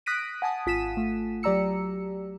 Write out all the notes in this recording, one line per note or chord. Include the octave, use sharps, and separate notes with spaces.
D#6 F#6 A#6 B6 D7 D#7
F#5 G#5 A5 D#6
G#1 F4 B6 D#7 E7
A3 F4
F#3 G4 D5 A#5 E6 C#7